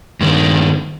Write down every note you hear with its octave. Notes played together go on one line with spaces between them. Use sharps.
G2 D#3